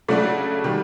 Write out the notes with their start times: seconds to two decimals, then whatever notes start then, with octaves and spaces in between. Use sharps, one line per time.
0.08 C#3 F#3 A3 D4 F#4
0.64 D#3 G3